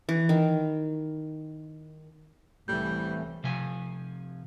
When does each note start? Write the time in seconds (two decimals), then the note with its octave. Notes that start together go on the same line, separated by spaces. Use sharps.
0.09 E3
0.29 D#3
2.68 C2 A2 E3 G3 G6
3.44 C3 F3 G#5